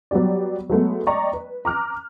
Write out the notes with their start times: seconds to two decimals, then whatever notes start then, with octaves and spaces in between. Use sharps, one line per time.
0.11 F#3 G3 B3 G4 D5
0.70 F#3 G#3 A3 B3
1.07 D5 D#5 G5 A#5 C#6
1.33 B4
1.65 A#5 D6 F6 F#6